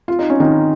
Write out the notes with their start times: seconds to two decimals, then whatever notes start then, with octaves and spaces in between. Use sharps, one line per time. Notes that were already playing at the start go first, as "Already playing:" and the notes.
0.08 F4
0.19 D#4
0.30 C#4
0.40 D#3 D#4